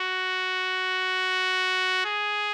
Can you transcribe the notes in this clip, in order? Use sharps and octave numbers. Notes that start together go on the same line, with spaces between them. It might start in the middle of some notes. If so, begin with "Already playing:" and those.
Already playing: F#4
G#4